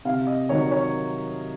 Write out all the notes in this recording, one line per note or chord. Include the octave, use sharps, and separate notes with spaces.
C3 F5
D#5
D#3 F#3 C#5
C#5